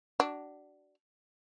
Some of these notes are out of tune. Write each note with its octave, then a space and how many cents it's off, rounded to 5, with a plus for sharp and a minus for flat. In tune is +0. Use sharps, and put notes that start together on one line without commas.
D4 +0 F#4 +30